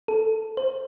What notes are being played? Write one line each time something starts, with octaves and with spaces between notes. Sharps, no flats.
A4
C5